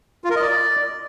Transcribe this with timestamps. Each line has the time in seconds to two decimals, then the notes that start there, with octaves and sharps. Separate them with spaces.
0.24 F4
0.30 A#4
0.36 D#5
0.42 D5